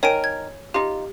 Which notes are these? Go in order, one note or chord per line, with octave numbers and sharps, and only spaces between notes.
D#3 A#4 C#5 G#5 D7
G#6
D#4 F4 G4